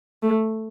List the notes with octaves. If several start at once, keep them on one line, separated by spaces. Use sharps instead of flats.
A3